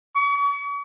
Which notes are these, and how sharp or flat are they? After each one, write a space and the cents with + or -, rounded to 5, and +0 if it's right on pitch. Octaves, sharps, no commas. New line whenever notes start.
C#6 +40